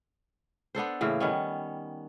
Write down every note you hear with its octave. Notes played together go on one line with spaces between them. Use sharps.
B3 D4 A4 C5
A2 C#3 E3 A#3
D#3 G3 B3 C#4